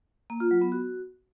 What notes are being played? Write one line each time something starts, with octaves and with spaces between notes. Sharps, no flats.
A#3
F4
F#3
B3
F#4